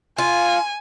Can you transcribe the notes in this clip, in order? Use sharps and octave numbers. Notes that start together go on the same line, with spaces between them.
F4 G#5